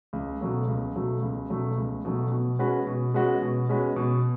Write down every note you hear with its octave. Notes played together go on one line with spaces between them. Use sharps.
C#2
B2 F#3 A3
C#2
B2 F#3 A3
C#2
B2 F#3 A3
C#2
B2 F#3 A3
B2
G#3 C#4 F#4 B4
B2
G#3 C#4 F#4 B4
B2
G#3 C#4 F#4 B4
B2